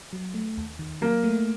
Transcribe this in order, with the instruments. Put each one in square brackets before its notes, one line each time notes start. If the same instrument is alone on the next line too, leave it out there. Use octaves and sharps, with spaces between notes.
[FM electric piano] F#3
A3
D#2
D#3
[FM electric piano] F#3 [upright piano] A#3
[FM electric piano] A3